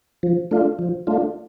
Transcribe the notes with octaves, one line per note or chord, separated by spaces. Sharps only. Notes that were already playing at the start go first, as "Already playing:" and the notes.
F3
A3 D4 F4
F3
A3 D4 F4